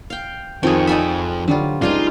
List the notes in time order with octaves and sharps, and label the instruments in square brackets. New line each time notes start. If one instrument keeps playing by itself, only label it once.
[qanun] F5 G5
[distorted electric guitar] F2 [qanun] D#3 F3 C#5 [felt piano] C4 [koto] G#4 G5
[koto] D#4 E5 [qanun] D5 G#5 B5
[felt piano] D3 [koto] F#3 G3 F4
[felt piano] C#2 [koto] D4 [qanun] D#4 G#4 D#5 [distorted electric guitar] F4